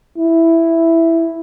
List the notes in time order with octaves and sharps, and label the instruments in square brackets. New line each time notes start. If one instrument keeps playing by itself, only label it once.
[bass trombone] E4